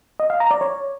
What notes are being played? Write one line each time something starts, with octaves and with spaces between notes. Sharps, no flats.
D#5
F5
A#5
D5
C#5